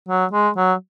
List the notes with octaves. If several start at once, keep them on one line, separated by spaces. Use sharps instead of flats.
F#3
G#3
F#3